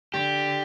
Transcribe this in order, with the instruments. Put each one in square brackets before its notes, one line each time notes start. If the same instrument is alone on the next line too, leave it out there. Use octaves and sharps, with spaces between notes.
[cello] D3 [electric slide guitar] G4